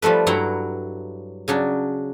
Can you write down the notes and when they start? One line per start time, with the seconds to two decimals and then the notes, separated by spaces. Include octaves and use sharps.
0.02 F3 G3 A3 B4
0.27 G2 F#3 E4 F#5 G5 A#5
1.48 C#3 F#3 D4